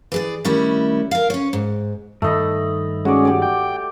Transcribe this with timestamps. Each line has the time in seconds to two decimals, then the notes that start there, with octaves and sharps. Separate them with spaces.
0.12 E3 G#4 D5
0.45 D#3 G3 A3 C#4 D4 E4
1.11 A#4 F5
1.30 C#4 C#5
1.53 G#2
2.22 G2 D#3 A3 D#5 B5
3.05 G#3 C#4 F#4 D5
3.25 G4 D5
3.42 G5